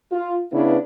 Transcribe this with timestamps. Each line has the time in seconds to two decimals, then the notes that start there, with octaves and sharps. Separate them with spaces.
0.12 F4
0.52 C#3 B3 D4 E4 B4